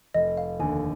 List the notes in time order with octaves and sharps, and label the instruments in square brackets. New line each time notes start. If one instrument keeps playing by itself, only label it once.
[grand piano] F1 [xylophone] D#5
[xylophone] F5
[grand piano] D#2 D3 [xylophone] G#5